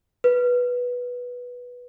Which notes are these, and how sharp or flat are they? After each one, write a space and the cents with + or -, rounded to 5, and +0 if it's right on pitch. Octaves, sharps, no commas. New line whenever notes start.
B4 -10